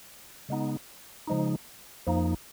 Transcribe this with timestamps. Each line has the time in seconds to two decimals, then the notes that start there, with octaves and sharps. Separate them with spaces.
0.49 C#3 G#3 B3 D#4
1.27 C#3 F3 G#3 D#4
2.07 F2 F3 A#3 D#4